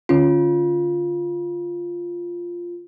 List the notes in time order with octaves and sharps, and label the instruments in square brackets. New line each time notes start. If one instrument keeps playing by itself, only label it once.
[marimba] D3 C#4 [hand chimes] F4